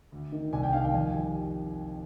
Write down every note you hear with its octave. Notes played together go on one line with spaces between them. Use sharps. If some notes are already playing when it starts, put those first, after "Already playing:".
D2
D#3
C2 G#5
G5
D#3 F5
G5
F2 G#5
G3